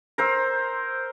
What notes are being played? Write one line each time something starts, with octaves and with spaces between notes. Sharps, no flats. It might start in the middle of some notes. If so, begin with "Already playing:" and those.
A#4 C5 E6